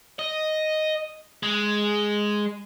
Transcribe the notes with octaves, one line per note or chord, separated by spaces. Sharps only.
D#5
G#3